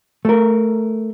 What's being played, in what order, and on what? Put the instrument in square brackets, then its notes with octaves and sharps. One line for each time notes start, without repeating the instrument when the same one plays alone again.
[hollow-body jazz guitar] A3 A#4